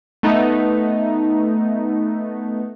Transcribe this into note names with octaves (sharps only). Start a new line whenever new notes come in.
A3 B3 D#4